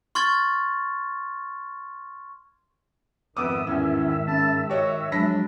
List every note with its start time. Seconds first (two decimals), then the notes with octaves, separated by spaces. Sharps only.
0.15 C6 C#6 F6 G#6 A6
3.37 F2 G#2 D#3 B3 E5 D6 D#6
3.67 E2 A2 E3 C#4
4.27 C#3 A5
4.69 F#4 G4 C#5 D#5
5.12 F3 F#3 G#3 D4 B5 A#6 B6